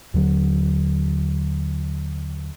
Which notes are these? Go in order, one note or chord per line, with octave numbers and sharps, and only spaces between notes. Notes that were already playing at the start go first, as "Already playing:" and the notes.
D#2 D3 F#3